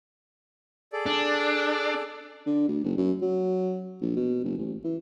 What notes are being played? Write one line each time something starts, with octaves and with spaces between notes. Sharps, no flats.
G#4 A4 D5
D4
D3
D2
F#1
F#2
F#3
A#1
B2
F#1
A1
E3